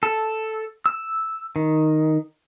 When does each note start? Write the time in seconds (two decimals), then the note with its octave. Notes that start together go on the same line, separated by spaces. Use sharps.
0.03 A4
0.86 E6
1.56 D#3